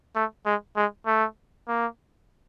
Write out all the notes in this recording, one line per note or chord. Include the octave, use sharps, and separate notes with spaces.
A3
G#3
G#3
A3
A#3